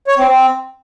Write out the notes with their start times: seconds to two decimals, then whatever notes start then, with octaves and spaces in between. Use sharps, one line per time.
0.07 C#5
0.18 C4
0.28 C4